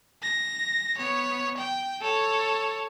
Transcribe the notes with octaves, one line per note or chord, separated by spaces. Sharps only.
A#6
B3 C#5
G5
A4 C#5